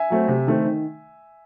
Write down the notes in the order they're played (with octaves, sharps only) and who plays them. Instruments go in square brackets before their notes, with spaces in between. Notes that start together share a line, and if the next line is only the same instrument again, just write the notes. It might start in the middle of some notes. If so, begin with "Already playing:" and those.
Already playing: [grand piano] E5 G#5
F#3 A3 C4
C3
D#3 A3 C4
D#3